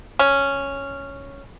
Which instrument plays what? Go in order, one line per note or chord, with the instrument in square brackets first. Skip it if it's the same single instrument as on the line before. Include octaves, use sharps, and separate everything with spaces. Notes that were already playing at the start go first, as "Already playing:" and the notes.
[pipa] C#4